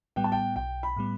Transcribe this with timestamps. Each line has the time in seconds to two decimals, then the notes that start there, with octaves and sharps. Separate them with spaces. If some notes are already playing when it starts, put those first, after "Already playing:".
0.16 A2 G3 B3 G5
0.24 A5
0.32 G5
0.56 B1 G5
0.83 B5
0.97 A2 G3 B3